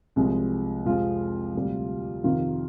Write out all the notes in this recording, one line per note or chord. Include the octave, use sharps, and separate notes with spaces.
C2 C3 F3 G#3
F2 C3 F3 G#3 F4
D2 C3 G3
F2 C3 D#3 F4